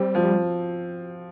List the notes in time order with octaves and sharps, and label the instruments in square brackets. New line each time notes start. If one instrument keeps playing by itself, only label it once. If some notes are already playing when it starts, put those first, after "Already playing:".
Already playing: [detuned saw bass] G3 [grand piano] C4
[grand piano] F3